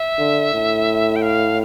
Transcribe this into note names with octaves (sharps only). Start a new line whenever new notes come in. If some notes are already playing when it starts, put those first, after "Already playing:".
Already playing: E5
D3
A2
G5
F5